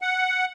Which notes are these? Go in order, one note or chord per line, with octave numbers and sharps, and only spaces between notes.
F#5